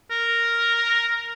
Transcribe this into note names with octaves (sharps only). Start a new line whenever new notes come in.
A#4